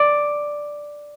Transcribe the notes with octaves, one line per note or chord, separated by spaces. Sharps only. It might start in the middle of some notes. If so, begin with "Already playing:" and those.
Already playing: D5